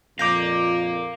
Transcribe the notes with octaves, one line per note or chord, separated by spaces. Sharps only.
F2 A#2 F5 A#5 D6 G6 A#6